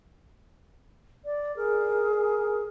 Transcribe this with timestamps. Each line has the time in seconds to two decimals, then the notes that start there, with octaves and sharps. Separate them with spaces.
1.25 D5
1.56 G#4 A#4
2.11 A#4